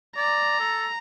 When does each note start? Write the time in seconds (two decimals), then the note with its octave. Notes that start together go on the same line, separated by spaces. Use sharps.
0.16 D5 A#5
0.59 A4